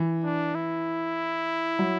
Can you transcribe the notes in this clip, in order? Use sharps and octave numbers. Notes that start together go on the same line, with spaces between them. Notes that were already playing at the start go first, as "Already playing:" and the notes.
Already playing: E3
D4
E4
F#3